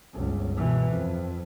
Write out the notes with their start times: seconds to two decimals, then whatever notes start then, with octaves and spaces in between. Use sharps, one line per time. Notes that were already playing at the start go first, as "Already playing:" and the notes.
0.15 G1 C#2
0.57 B2 E3
0.91 F2